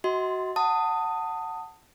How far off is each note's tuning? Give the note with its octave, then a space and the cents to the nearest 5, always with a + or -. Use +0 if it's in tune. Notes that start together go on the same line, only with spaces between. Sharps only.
F#4 +15 D#5 +40 C6 +0
F#5 +0 A5 +25 D#6 +0